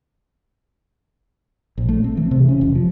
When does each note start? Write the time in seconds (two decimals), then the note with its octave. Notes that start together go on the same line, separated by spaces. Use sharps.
1.78 A#1
1.89 A3
2.04 C4
2.17 E3
2.31 C3
2.49 C#4
2.61 F1
2.75 F3